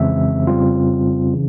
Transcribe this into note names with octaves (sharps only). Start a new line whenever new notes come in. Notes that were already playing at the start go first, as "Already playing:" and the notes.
Already playing: F2 C#3 E3 G#3 C4 E5
F2 C#3 G3 C4 F4
C#3 E3